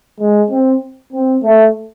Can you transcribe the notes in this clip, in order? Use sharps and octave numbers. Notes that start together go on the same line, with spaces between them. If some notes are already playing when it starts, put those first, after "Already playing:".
G#3
C4
C4
A3